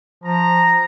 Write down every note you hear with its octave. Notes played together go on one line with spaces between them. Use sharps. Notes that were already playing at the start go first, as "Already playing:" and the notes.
F3 A#5